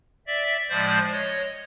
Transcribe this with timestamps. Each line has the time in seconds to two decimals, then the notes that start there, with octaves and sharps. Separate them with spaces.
0.27 D5 E5
0.69 A2 F3 G#3 C5 D5
1.12 C#5 D#5